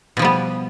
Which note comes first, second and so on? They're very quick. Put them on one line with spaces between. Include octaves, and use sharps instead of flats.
B2 F3 G3 B3